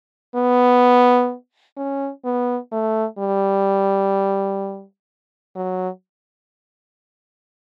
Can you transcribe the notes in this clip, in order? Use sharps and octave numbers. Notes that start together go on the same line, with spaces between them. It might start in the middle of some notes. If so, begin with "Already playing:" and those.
B3
C#4
B3
A3
G3
F#3